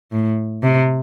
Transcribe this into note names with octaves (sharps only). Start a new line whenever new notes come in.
A2
C3